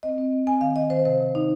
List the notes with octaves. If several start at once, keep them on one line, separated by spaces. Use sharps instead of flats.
C4 D#5
C4
C4
C4 G#5
D#3 F5
D#3 D#5
D#3 C5
C3 C5
C3
C3 D#4